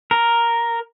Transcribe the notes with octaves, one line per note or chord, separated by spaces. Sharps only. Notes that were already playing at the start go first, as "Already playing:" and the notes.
A#4